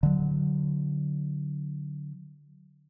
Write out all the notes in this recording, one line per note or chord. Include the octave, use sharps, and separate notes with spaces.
D3 F#3